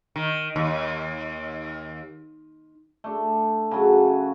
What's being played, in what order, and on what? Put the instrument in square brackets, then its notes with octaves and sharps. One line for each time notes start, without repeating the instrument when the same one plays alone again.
[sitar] D#3
D#2
[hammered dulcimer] A3 D4
C#3 F#3